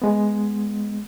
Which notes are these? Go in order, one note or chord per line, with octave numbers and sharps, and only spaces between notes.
G#3 B3